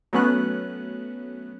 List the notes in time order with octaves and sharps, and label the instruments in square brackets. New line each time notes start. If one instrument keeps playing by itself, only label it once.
[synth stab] F#3 A3 B3 C#4 F#6